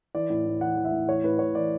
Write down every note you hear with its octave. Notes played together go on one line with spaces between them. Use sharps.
E3 D5
A2
A2
E3 F#5
E3
E5
A2
E3 C#5
A2 B4
A2 C#5
E3 D5